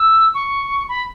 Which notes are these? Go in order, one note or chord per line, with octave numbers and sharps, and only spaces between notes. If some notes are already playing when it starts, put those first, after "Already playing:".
Already playing: E6
C#6
B5